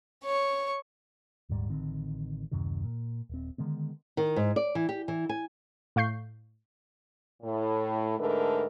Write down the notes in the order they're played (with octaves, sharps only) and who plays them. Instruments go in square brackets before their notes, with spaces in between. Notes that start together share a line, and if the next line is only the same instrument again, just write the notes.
[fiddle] C#5 C#6
[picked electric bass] D#1 D2 G#2 G3
A1 D3 D#3 C4
D1 F#2 C3 D#3
A#2
D#1 C4
D3 D#3 G#3 B3
[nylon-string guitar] D#3
G#2
D5
E3
G4
E3
G#5
[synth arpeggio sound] A2 F5 C#6 G6 C7
[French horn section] A2
G#2 D3 A3 A#4 B4